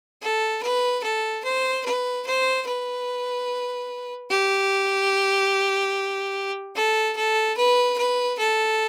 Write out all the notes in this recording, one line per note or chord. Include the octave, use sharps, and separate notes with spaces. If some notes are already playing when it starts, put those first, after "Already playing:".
A4
B4
A4
C5
B4
C5
B4
G4
A4
A4
B4
B4
A4